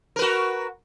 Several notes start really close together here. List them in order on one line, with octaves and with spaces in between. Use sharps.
A#4 B4 F#4